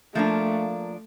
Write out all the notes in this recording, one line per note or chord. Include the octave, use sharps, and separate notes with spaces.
F3 A3 A#3 D4